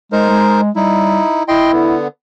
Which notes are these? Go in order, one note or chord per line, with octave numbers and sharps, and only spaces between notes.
G#3 D#4 A#4 C5
G#3
G3 D#4 E4
E4 D#5 G5 C6
D3 B3